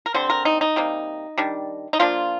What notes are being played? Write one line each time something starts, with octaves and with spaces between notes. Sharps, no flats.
A#4
D3 G3 C4 C5
A#4
D#4
D#4
C3 G3 A#3
D#3 G3 D4
D#4
F3 A#3 D4 F4